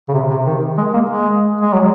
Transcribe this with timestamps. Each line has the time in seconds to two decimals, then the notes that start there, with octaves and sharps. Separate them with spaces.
0.09 C#3
0.14 C3
0.30 C3
0.46 D#3
0.78 G#3
0.94 A#3
1.10 G#3
1.61 G#3
1.73 F#3